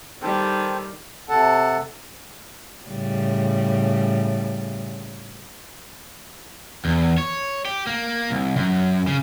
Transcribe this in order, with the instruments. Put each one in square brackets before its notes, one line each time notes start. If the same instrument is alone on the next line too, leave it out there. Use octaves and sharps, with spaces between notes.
[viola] D#3 G3 [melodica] A4 C5 G5
[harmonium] C3 A4 F#5 A5
[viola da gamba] A2 C#3 G3
[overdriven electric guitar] E2
C#5
G4
A#3
C2
F#2
C#3